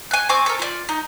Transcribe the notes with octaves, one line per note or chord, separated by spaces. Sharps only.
G#5 F#6
C4 G#5 C#6 D6
A4 A#4
F4 D5
D#4